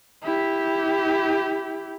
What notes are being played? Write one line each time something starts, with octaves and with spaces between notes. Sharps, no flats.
E4 G4